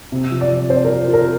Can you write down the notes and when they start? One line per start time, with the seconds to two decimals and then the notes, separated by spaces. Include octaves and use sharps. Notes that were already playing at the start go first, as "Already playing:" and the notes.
0.12 C3
0.31 F3
0.41 D5
0.50 F3
0.70 C4 C5
0.85 F4 A#4
1.08 F4
1.13 A#4